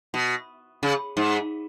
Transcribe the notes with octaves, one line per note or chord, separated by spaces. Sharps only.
B2
C#3
G#2